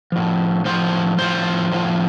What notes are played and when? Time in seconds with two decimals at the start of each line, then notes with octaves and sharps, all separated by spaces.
0.12 A2 F3
0.65 A2 F3 C5
1.18 A2 F3 C5
1.72 A2 F3